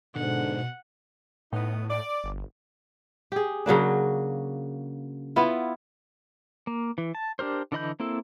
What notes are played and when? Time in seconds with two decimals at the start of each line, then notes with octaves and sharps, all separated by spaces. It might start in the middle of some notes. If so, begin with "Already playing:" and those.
0.16 G#2 B2 D3 F#5
1.52 A2 B3 D#4
1.90 D5
2.24 G1
3.32 G4 G#4
3.66 C#3 F#3 A#3 D4
5.36 B3 E4 F4
6.67 A#3
6.98 E3
7.15 A5
7.39 D4 G4 A#4 C5
7.72 D3 E3 D#5 B5 G6
8.00 A#3 C4 E4 A4